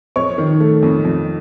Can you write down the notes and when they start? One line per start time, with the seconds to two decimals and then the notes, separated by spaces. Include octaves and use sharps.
0.16 F2 C#5 C#6
0.38 D#3
0.60 A3
0.83 F2
1.05 F2